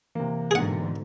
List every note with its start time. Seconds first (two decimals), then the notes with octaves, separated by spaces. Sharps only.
0.15 C3 E3 A#3
0.51 G#2 B2 D3 G#4 F#5